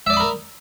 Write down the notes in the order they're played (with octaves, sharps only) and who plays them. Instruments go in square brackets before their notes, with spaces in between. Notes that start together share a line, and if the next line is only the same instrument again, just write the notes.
[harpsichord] E5
D5
D#6
B5
A#4